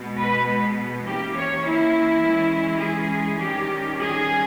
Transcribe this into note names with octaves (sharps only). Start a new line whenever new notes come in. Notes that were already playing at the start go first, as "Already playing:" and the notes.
Already playing: B2 G#3 B3
B4
E3 A#3 C#4 G4
C#5
E4
E3 G#3 C#4
G#4
D#3 G3 C#4 G4
G#4